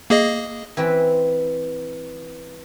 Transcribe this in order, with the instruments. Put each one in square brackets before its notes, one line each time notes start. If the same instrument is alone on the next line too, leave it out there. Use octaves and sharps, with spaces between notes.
[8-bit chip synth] A#3 G#4 D#5
[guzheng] E3 C4 B4